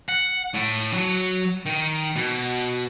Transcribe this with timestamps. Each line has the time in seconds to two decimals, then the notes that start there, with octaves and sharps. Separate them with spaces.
0.09 F#5
0.54 A2
0.93 F#3
1.66 D#3
2.16 B2